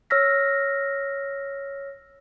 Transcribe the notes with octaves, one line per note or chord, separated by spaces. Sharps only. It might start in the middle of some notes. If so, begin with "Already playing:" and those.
C#5 E6 F6 A#6 B6